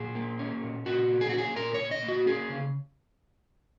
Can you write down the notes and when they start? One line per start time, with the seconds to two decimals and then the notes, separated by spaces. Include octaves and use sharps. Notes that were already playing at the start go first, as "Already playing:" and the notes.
Already playing: A#2 G#4
0.15 A#3
0.39 C#4
0.63 A#2
0.86 A#2 F#4
1.10 A#3
1.21 G#4
1.30 C#4 F#4
1.38 G#4
1.56 A#2 A#4
1.74 A#2 C#5
1.91 D#5
2.03 A#3
2.08 F#4
2.26 C#4 G#4
2.49 C#3